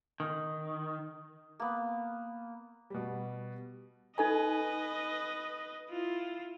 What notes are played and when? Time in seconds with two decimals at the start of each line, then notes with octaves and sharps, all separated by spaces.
0.20 D#3
1.60 A#3 B3
2.90 B2 G3
4.18 D#4 A4 B4 D#5 G#5
5.90 E4 F4